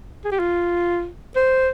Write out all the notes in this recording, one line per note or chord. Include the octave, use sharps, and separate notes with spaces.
G#4
G4
F4
C5